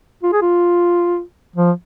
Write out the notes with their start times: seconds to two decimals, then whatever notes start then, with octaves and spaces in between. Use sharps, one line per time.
0.23 F4
0.32 G#4
0.42 F4
1.56 F3